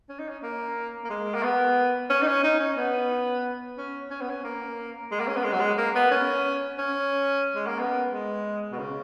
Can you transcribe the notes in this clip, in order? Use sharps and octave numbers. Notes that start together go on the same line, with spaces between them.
C#4
D#4
C#4
A#3
A#3
G#3
A#3
B3
C#4
D#4
C#4
D#4
C#4
B3
C#4
C#4
B3
C#4
A#3
G#3
A#3
C#4
B3
G#3
F#3
G#3
A#3
B3
C#4
C#4
G#3
A#3
B3
G#3
B2
C#3